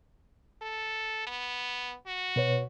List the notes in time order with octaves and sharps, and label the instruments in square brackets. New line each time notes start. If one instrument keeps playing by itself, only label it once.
[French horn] A4
B3
F#4
[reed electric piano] B2 B4 C#5